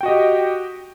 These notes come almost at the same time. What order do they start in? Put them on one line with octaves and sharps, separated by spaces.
G5 F#4 D#5 G4